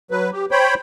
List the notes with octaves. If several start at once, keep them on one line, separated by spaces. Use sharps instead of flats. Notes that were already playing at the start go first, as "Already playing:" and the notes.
F#3 B4
G4
C5 C#5 G5 B5